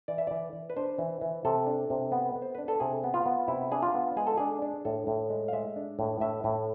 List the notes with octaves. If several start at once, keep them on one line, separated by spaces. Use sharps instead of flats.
E3 D5
E5
E3 D5
E3
B4
D4 C5
E3
E3
C3 A4
D4
C3
B3
B3
C5
D4 B4
A4
C3 G#4
B3
F4
B3
C3 E4
D4 G#4
F4
B3
G#3 G#4
A4
D4 G#4
D4
A2 A4
A2
G#3
F5
G#3 E5
D4
A2
A2 E5
A2